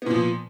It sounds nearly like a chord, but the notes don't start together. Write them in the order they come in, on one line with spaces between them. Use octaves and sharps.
B3 A#2 F3